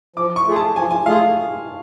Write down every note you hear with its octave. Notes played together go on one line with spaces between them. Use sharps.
F3 D6
C#6
A3 F4 G#4
A5
F3 G#5
G#5
A3 F4 G#4 F5